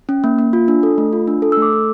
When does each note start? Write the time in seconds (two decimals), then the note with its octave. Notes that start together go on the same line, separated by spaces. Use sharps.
0.09 C#4
0.24 A#3
0.38 A#3
0.53 F4
0.68 D4
0.83 A4
0.98 A3
1.13 F4
1.27 D4
1.42 A4
1.52 E6
1.57 A3
1.62 D6
1.72 A4